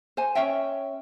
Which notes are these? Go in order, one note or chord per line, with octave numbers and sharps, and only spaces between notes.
C5 G#5
C#4 C#5 E5 G5